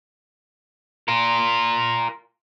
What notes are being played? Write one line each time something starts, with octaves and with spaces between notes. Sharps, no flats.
F4 A#4